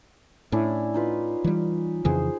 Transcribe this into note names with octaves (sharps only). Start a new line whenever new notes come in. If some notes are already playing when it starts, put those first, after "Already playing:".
A2 C#4 D4 E4
D#4 F4 B4
E3 G3
F2 C#3 E3 G#4 C5